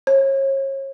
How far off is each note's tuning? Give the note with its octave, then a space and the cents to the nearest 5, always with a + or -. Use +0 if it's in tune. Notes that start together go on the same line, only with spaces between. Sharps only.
C#5 -35